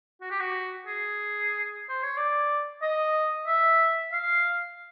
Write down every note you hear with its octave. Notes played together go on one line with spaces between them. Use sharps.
F#4
G4
F#4
G#4
C5
C#5
D5
D#5
E5
F5